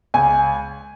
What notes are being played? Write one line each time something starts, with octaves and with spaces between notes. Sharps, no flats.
C#2 G#5